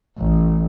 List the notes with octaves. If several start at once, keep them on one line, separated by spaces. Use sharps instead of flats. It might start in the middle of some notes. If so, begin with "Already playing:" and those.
A1